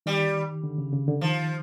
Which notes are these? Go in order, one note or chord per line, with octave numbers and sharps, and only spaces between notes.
D#3 G3
D3
C#3
C#3
D3
D#3 F3